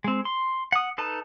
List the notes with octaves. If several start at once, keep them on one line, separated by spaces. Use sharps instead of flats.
G#3 C4
C6
F#5 D#6
D#4 A4 B4 A5